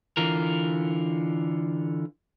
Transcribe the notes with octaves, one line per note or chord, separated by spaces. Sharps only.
D3 E3 F4 A#4